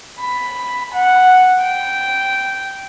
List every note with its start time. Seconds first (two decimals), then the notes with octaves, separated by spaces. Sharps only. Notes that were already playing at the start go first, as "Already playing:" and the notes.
0.20 B5
0.94 F#5
1.62 G5